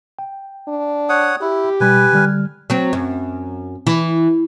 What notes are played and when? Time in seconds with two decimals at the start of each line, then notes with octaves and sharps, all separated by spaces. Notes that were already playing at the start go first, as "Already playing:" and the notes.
0.19 G5
0.68 D4
1.09 C#5 F#5 D#6
1.41 E4 G4
1.80 B2 G3 B4 G#5 B5
2.13 D3 G3 F6
2.70 F#3 C4
2.93 F#2
3.87 E3